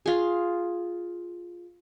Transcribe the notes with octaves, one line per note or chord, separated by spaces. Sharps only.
F4 G#4